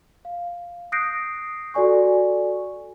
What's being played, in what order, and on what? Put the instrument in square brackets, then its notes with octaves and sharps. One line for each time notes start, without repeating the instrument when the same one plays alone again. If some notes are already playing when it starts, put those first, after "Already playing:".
[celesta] F5
D#6 F#6 G6 A#6 C7 D7
F#4 A4 D5 G#5 C#6